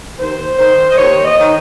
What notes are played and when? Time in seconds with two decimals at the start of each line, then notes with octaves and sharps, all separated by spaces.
0.19 D#2 C5
0.59 D#3 C5
0.90 D#5
0.98 D#2 C#5
1.25 D#5
1.39 D#3